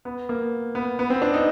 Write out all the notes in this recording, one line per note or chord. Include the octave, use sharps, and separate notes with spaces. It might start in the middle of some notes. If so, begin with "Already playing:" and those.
B3
A#3
B3
B3
C4
D4
D#4